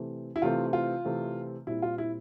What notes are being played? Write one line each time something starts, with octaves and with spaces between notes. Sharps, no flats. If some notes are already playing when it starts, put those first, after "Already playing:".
Already playing: C3 E3 A3 C4
E4
C3 E3 A3 C4 F4
F4
C3 E3 A3 C4
A#2 G3 C4 E4
F4
E4